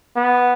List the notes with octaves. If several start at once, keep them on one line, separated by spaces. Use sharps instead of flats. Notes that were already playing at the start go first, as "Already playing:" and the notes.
B3